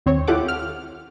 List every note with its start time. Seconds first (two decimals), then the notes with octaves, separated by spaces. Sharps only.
0.06 D#2 C4 C#5
0.27 E4 F4 G4 A4 F#5 D6
0.48 F6